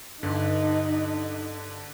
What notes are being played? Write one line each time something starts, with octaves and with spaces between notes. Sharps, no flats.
G2 D3 D4 D#4